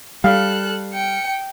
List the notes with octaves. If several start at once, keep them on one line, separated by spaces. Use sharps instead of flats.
G3 A4 F5 F6 F#6
G5 C#7